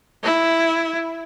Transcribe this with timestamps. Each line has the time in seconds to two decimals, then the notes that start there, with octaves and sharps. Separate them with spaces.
0.24 E4